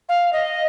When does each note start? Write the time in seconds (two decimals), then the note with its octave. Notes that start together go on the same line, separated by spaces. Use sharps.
0.09 F5
0.33 D#5